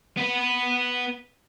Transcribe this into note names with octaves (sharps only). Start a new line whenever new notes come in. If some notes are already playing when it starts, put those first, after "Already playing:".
B3 B4